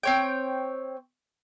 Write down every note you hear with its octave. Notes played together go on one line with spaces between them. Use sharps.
C4 C#5 G5